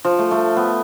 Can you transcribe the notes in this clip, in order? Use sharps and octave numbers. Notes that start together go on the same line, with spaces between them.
F3
A3
A3
B3